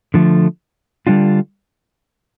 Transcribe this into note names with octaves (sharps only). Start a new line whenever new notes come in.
D3 F3 A3
D3 G3 D4 F4